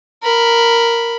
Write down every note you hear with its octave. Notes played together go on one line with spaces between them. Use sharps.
A#4 B5